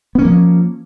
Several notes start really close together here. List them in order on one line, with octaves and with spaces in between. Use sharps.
B3 C#4 A#3 F3